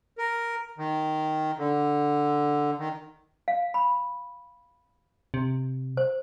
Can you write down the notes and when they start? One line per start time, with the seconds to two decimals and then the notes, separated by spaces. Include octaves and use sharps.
0.18 A#4
0.78 D#3
1.58 D3
2.78 D#3
3.48 F5
3.74 B5
5.34 C3
5.97 C5